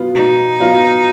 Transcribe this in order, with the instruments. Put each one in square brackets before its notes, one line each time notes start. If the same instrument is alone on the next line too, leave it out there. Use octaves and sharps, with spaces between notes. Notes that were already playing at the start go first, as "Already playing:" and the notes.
Already playing: [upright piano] B2 F#3 B3 F4
[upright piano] B2 [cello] D#4
[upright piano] F#3 B3 F4